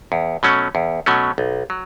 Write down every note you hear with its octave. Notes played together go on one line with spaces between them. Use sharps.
E2
B2 F#3 A3 C#4
E2
B2 F#3 A3 C#4
B1
F#3